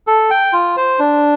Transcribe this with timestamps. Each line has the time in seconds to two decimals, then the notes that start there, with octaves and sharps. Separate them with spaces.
0.07 A4
0.30 G5
0.53 F4
0.77 C5
0.99 D4